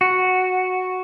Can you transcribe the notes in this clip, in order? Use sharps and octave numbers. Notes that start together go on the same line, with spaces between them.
F#4